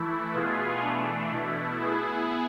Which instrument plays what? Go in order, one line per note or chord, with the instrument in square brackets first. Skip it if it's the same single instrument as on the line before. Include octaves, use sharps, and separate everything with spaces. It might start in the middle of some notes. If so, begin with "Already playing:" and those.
Already playing: [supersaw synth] E3 A3 E4
B2 B3 F4 G#4
E3 A3 D4
B2 A3 E4
B3 E4 G#4